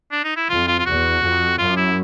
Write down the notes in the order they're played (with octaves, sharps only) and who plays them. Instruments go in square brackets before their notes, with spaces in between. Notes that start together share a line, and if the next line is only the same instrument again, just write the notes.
[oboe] D4
D#4
E4
[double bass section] F2 [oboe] F4
[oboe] F4
F4
[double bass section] E2 [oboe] F#4
[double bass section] F2
[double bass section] F#2 [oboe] F4
[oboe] E4